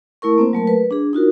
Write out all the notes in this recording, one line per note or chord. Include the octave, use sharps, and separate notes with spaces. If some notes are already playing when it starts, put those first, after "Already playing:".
A3 E4 A#4 C#6
A#3 C4 C5
F#3 A3 A#4
B4
D4 G#4
D#4 F4 F#4 A#4